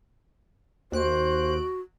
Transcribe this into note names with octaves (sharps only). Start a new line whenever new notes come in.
D#2 F#4 C5 F#6 D7